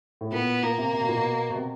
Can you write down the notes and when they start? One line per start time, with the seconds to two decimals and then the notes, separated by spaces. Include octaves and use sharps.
0.21 A2
0.32 A#2 B3
0.63 A#2 A#3
0.78 C3
0.93 C3
1.01 B2
1.09 A#2
1.16 B2
1.50 B2
1.56 C3